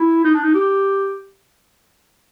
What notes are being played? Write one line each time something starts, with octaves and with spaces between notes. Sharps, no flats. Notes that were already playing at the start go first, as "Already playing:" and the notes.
Already playing: E4
D#4
D4
D#4
G4